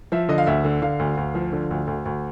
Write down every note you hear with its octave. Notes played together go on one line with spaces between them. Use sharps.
F3 E5
D3 D#5
F5
D2 E5
D3
D3 F5
D2
D2
F3
D3
D2
D2
D2